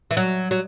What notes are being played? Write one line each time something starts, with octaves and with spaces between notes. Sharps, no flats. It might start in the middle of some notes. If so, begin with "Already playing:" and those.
E3
F#3
F#3